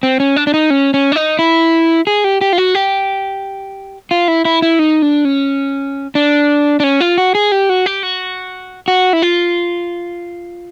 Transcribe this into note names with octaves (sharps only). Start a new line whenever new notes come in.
C4
C#4
D4
D4
D#4
C#4
C#4
D4
D#4
E4
G#4
G4
G4
F4
F#4
G4
F4
E4
E4
E4
D#4
D4
C#4
D4
D4
C#4
F4
F#4
G#4
G4
F#4
G4
F#4
F#4
E4
F4